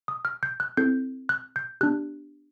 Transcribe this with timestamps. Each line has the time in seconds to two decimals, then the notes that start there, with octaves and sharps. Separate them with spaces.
0.08 D#6
0.25 F6
0.43 G6
0.60 F#6
0.77 C4 E4 A4 G6
1.29 F#6
1.56 G6
1.81 B3 D4 G4 F#6